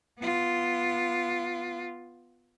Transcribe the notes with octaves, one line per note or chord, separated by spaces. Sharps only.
B3 F4